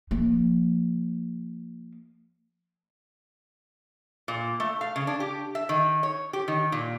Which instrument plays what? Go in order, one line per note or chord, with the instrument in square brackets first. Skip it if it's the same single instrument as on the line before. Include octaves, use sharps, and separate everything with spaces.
[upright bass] F3 A#3
[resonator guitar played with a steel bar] A#2
A3
F5
C#3
D4
G4
E5
D#3
C#5
G4
D#3
A#2